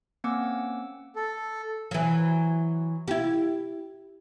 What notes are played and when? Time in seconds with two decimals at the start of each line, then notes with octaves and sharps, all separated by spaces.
0.24 A#3 C4 C#4 F#5 D6 E6
1.16 A4
1.91 E3 F#3
3.08 E4 G4